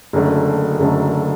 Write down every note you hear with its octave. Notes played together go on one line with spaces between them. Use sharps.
F#1 F#2 D3 A3
F#1 F#2 D3 A3